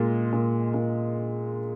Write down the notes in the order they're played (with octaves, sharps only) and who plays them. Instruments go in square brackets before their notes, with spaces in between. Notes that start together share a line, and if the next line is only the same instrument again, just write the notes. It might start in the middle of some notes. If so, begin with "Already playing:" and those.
Already playing: [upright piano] A#2 G#3
A#2
A#2